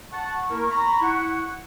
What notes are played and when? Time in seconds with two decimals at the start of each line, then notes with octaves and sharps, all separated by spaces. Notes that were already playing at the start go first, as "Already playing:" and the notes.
0.12 F#5 A5 C#6
0.50 A#3 E4 A#4
0.71 A#5 B5
1.02 E4 F#5